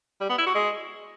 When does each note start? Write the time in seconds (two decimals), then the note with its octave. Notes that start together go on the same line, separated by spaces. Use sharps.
0.21 G3
0.29 B3
0.38 E4
0.46 F#4
0.55 G#3